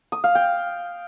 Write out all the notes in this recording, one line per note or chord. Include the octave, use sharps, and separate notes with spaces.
D#6
F5
G5